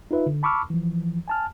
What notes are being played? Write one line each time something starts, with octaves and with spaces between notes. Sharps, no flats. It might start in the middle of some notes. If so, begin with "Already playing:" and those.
D#4 F4 B4 E5
D3
A5 B5 C#6 D6 E6 F6
E3 F3
G#5 A5 F6